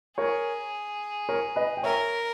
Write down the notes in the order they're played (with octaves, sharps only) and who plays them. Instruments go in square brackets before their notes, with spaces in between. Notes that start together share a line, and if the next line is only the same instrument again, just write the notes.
[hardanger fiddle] G#4 [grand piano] A#4 C#5
[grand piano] A#4 C#5
B4 D#5
G5
[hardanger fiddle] A#4 [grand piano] C#5 E5